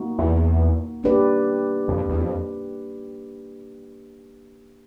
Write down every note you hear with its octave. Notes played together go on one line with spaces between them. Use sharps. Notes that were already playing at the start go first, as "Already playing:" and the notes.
Already playing: A#3 D#4 F#4
E2
A#3 D4 G4 B4 D5
F2
E2
F2